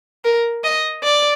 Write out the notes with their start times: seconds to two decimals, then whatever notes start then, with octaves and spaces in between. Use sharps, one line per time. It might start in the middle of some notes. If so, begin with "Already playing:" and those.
0.25 A#4
0.64 D#5
1.04 D5